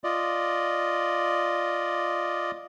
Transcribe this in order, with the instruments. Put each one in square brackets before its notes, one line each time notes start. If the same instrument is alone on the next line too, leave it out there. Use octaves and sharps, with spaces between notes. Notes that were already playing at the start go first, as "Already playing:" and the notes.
[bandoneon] F4 D5 D#5